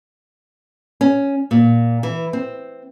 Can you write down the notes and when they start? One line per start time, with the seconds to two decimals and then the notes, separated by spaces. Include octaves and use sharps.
1.01 C#4
1.51 A#2
2.03 E3
2.33 C4